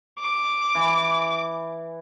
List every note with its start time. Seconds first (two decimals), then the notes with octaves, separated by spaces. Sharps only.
0.19 D6
0.75 E3